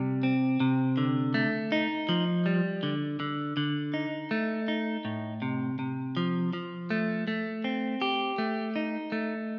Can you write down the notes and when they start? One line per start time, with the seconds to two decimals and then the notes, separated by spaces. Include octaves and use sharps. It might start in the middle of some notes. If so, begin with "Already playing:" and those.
Already playing: C3 G3
0.23 C4
0.60 C3
0.97 D3
1.34 A3
1.72 D#4
2.09 F3
2.46 G3
2.83 D3
3.20 D3
3.57 D3
3.94 D#4
4.31 A3
4.68 D#4
5.05 A2
5.42 C3
5.79 C3
6.17 F3
6.53 F3
6.90 A3
7.28 A3
7.64 C4
8.02 G4
8.38 A3
8.76 D#4
9.12 A3